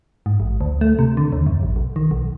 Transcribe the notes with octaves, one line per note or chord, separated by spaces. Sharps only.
G#2
A1
D2
A3
C3
D3
D#2
F#2
A1
B1
D#3
B1